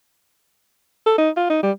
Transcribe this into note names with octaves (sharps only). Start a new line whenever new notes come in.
A4
D#4
F4
D#4
G3